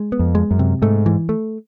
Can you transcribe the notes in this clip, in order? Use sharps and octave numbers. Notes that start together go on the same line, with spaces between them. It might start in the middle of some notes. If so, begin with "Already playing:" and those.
Already playing: G#3
B3
F2
G#3
F#2
C3
G#2 A3
E3
A3